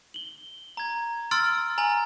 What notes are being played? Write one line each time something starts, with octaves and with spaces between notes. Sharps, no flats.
F#7 G7
A#5 G#6
C6 E6 F6 A6 D7
G#5 A#5 F#7